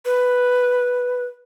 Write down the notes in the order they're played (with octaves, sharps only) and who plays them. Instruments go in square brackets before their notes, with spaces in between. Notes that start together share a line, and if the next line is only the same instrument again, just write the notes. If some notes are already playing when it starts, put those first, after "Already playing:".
[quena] B4